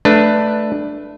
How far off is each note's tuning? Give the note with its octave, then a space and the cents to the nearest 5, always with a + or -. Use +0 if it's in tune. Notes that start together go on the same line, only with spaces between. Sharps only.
A3 +0 D4 +10 B4 +0